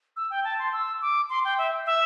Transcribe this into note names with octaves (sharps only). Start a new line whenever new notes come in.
E6
G5
A5
C6
E6
D6
C6
G5
E5
E5